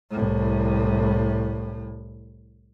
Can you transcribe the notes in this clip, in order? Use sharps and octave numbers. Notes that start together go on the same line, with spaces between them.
C2 A2